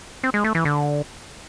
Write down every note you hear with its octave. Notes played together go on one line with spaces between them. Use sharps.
C4
G#3
A3
E3
D3